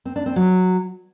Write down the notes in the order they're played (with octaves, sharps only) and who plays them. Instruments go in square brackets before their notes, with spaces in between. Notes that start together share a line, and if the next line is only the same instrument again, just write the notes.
[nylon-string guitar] C4
D4
C4
F#3